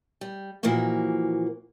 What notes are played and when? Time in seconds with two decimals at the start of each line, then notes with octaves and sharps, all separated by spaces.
0.21 G3
0.63 A#2 E3 F3 A#3 F#4